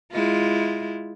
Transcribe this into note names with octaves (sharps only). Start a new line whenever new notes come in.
G#3 E4 F4